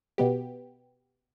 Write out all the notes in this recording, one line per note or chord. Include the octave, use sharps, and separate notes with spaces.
B2 B3 G4